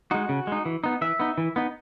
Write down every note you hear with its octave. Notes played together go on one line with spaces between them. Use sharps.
G#3 D#4 F#4
C#3
G#3 D#4
E3
B3 D#4
E3 E5
B3 D#4
E3
B3 D#4